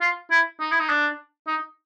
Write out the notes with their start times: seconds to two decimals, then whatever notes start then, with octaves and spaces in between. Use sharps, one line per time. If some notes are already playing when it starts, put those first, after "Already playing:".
0.01 F4
0.31 E4
0.60 D#4
0.72 E4
0.80 D#4
0.89 D4
1.47 D#4